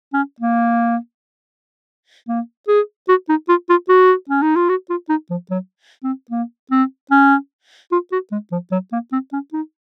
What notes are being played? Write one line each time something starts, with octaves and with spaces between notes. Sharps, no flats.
C#4
A#3
A#3
G#4
F#4
D#4
F4
F4
F#4
C#4
D#4
F4
F#4
F4
D#4
F3
F#3
C4
A#3
C4
C#4
F4
F#4
G#3
F3
F#3
A#3
C4
C#4
D#4